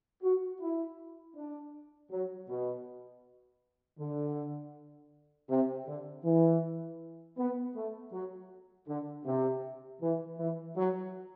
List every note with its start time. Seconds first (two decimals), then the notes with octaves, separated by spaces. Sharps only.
0.23 F#4
0.61 E4
1.36 D4
2.11 F#3
2.49 B2
3.99 D3
5.49 C3
5.87 D3
6.25 E3
7.38 B3
7.75 A3
8.13 F#3
8.88 D3
9.25 C3
10.01 E3
10.38 E3
10.76 F#3